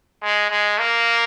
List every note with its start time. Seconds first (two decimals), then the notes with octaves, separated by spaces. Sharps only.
0.22 G#3
0.50 G#3
0.78 A#3